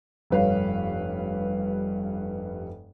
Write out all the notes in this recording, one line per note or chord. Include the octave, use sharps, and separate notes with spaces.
F1 G2 B4 C#5 F5